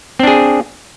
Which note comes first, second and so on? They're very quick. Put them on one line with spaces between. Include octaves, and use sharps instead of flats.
C4 D4 G#4